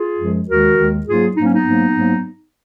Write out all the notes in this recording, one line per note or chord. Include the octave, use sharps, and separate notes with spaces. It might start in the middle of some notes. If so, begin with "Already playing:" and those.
Already playing: F4 G#4
F#2 F3 G#3
D#2 D#3 G#3 F#4 A#4
D#2 D#3 G#3
G#2 F#3 A#3 F4 G#4
G#2 F#3 A#3 D#4
C#4
B3 D#4
G#2 F#3 A#3
G#2 F#3 A#3